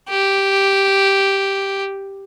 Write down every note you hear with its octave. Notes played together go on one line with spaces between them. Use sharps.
G4